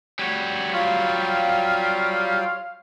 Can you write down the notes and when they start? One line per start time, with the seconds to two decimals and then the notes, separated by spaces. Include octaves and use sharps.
0.19 G3 F#4 C#5
0.73 F#3 F4 C#5 F5